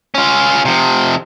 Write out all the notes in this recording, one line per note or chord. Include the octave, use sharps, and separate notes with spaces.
C#4 F4
C3 F3